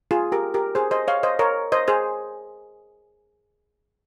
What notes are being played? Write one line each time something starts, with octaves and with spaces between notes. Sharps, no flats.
F4 G#4
G4 A#4
G4 A#4
G#4 C5
C5 D#5
C#5 F5
C5 D#5
A#4 C#5
C5 D#5
G#4 C5